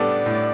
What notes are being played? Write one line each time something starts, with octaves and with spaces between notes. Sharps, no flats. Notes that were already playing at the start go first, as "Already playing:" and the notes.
Already playing: A2 G3 B3 D4 A4 D5
A2